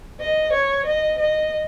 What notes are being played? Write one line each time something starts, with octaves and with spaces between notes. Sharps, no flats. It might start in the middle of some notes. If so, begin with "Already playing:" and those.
D#5
C#5
D#5
D#5